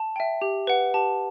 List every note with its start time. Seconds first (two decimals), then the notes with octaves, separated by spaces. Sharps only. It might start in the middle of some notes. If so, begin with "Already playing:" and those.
Already playing: A5
0.16 E5 G5
0.42 G4
0.67 B4 F#5
0.94 G4 A5